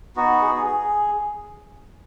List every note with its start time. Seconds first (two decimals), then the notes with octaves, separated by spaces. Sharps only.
0.16 B3 D#4 F#4
0.41 G#4
0.66 G#4